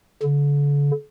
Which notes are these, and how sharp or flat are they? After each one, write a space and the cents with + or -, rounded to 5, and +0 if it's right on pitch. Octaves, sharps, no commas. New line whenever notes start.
D3 -40